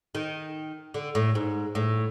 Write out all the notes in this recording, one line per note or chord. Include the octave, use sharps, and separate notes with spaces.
D#3
D3
A2
G#2
A2